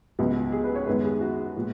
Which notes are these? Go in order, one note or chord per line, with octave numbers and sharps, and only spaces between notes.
C#2 B2 F#3 B3
G#4
B4
C#5
F#2 D#3 G#3 B3 B4
G#4
F#4
A#2 F3 G#3 B3